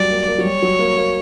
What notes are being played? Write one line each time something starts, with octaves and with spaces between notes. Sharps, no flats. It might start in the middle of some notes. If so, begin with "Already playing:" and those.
Already playing: F#3 G3 D5
A#3
A#3
F#3
G3 C#5
F#3
A#3
A#3